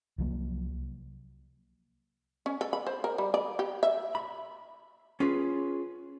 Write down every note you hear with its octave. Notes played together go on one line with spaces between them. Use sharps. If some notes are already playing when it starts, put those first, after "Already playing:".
C2 F3 F#3 A#3
C#4
A4
B5
C5
A#4
G3
D5
G4
E5
B5
C#4 F4 G#4 B4